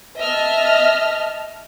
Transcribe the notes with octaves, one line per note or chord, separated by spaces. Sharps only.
D#5 E5 A5 F6